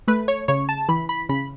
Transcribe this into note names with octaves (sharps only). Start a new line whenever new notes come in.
A3 B4
C#5
C#3 C#5
A5
E3 B5
B5
C#3 B5